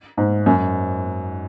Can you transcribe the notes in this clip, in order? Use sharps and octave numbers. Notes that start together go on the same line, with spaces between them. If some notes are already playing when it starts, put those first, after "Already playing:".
G#2
F#2